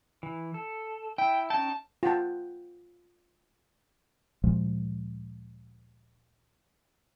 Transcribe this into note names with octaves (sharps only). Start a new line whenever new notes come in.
E3
A4
E4 G5
C#4 D#4 G5 A5
F4 F#5 G5 A5
D2 A#2 F3 G#3